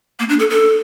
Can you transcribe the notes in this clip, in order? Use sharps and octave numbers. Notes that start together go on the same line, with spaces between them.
A#3
D4
A4
A4